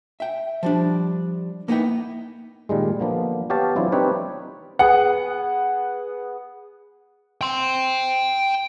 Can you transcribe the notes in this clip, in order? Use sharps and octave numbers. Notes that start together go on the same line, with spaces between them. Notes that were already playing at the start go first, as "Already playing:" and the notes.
E5 G5
F3 G3 D4
A#3 B3 D#4 E4 G5
A#2 D#3 G3 G#3
D3 F3 A#3 B3
B3 G4 C#5 F5 A5
E3 F#3 C4 D4 E4 F4
C4 D4 D#4 G4 B4 C#5
B3 G#4 F#5
G5 C6